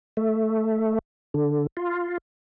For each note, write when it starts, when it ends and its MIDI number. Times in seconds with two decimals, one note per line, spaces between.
0.17 0.99 57
1.34 1.67 50
1.77 2.18 65